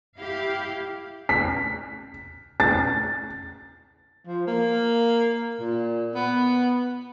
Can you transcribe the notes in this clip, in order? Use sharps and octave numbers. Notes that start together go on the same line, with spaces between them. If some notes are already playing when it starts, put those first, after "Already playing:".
E4 G4 F5
B6
A6
F3
A#3
A#2
B3